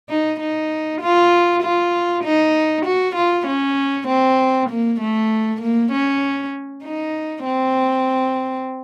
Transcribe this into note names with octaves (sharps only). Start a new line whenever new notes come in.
D#4
D#4
F4
F4
D#4
F#4
F4
C#4
C4
A#3
A3
A#3
C#4
D#4
C4